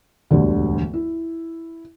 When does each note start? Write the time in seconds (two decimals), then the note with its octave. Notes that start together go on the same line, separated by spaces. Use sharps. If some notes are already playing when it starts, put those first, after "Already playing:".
0.31 E1 D2 G2 D3
0.93 E4